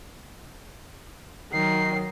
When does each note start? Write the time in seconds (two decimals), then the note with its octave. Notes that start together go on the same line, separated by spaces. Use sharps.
1.53 D#3 F#3 C7